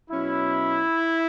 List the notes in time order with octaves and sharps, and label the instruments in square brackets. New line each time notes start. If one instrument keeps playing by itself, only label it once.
[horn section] B2 F#3 C#4 E4